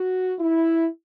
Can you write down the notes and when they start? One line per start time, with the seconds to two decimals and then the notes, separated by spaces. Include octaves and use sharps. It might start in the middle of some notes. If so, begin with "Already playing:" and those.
Already playing: F#4
0.39 E4